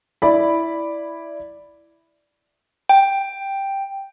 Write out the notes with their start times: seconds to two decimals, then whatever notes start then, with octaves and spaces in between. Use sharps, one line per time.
0.22 E4 D5 B5
2.89 G5